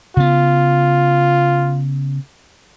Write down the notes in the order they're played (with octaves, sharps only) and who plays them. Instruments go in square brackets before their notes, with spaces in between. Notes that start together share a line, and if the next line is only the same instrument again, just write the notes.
[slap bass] C#3 B3 [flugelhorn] F4